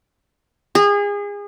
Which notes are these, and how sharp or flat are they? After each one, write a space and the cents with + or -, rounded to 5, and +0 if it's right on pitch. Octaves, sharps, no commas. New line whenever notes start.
G#4 -30